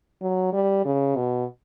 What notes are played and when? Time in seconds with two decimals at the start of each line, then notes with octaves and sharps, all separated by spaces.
0.22 F#3
0.53 G3
0.85 C#3
1.16 B2